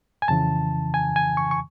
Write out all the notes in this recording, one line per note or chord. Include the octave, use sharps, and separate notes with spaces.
G#5
F2 C#3 E3 A5
G#5
G#5
C#6
C#6